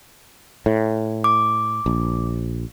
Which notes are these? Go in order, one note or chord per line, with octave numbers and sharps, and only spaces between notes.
A2
D6
A#1